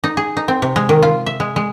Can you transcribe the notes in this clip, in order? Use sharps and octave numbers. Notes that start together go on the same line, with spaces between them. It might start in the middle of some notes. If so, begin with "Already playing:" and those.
D#4
G#4
D#4
C4
C3
G#3
D#3
F4
E5
G#3
G#3